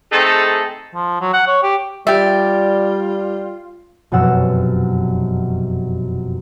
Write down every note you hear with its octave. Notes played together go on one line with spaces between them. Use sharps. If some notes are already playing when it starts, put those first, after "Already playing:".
A3 C4 D#4 G#4 A4
F3
F#3
F#5
C#5
G4
G3 F4 G4 D5 E5 G5
F1 F#2 B2 F#5 E6